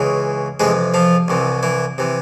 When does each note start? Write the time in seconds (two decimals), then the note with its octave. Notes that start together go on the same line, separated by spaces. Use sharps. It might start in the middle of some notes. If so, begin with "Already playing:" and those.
Already playing: C#2 C#3 E3
0.60 F2 C3 E3 G#3 G#4
0.94 F3 F4
1.28 C2 C3 E3
1.63 E3 E4
1.98 C3 E3